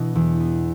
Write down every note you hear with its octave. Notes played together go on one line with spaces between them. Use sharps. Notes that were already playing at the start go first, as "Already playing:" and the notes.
Already playing: B2 E3 B3 D4 E4
E2
B3